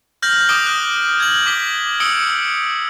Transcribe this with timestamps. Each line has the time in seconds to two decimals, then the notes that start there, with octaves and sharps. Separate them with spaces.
0.22 F6 G6 A#6 F#7
0.49 D6 D#6 D7 G7
0.66 D#6 F#6
1.20 G#6 F#7
1.46 D6 B6 G7
2.00 D#6 E6 C#7 D7 G7